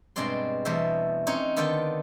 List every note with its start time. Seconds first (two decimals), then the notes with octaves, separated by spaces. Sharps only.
0.16 G2 B2 G#3 C4 D5 C6
0.65 E2 B2 G3 A3 C5 E5
1.27 C4 C#4 D#4 C#5
1.57 D3 D#3 B3 F4 A4 G5